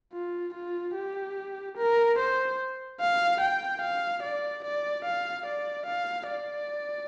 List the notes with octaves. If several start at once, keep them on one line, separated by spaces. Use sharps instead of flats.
F4
F4
G4
A#4
C5
F5
G5
F5
D5
D5
F5
D5
F5
D5